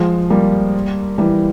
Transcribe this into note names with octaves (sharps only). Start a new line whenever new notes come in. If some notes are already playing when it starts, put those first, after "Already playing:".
Already playing: F3 G#3
G3 A#3
E3 G3